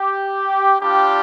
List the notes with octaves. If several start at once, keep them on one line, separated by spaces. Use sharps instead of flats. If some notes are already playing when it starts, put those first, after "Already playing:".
Already playing: G4
G3 D4 F4 G4